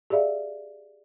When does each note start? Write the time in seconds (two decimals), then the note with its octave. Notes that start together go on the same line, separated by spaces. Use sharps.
0.10 G4 G#4 D5 E5 F5